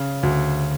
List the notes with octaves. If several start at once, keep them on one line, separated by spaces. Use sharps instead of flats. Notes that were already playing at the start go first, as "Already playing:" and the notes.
Already playing: C#3
D2